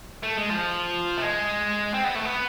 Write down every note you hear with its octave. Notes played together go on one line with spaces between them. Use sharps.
A3
G#3
F3
A3
G#3
C4
B3
A3
B3